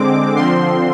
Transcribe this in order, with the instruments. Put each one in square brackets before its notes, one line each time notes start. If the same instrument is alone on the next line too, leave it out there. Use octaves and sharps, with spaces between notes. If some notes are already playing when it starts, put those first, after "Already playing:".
Already playing: [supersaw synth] D3 G#3 C4 D6
D3 F3 C4 C6